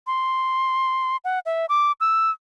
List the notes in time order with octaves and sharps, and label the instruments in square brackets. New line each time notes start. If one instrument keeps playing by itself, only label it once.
[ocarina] C6
F#5
E5
D6
E6